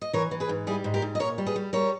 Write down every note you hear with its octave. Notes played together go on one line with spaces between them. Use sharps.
D#5
E3 A#4 C#5
E3
G#4 B4
G#2
G3 E4 G#4
G#2
G4 A#4
G#2
D#5
A#2 A#4 C#5
G3
G#4 B4
G3
G3 A#4 C#5